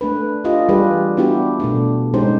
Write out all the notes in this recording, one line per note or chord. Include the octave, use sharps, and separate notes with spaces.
A3 D4 B4
D4 F4 G4 D#5
E3 G3 F4 G4 G#4 B4
B3 D4 E4 F#4 G4
B2 A3 D4
G#3 C#4 D#4 G4 C5